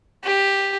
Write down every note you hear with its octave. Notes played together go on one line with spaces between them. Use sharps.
G4